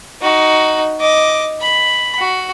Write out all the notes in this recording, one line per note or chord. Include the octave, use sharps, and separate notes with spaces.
D#4 F#4
D#5 D6
B5
F#4